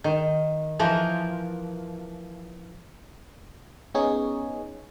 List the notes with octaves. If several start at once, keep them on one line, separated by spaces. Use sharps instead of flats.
D#3
E3 F3 A#4
B3 C#4 D#4 G#4 C#5